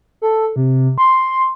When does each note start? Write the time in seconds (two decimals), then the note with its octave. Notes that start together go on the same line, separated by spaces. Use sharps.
0.22 A4
0.56 C3
0.98 C6